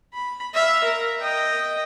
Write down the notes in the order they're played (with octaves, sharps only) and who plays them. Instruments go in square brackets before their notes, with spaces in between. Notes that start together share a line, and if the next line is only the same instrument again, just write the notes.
[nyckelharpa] B5
E5 F5
A#4
D#5 G5